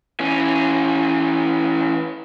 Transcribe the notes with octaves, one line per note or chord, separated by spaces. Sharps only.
E3 C#4